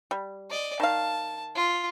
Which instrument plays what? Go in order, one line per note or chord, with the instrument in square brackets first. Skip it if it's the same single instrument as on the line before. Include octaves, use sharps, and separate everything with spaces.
[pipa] G3
[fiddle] D5 D#5
[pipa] D#3 F5 [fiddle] A5
[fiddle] F4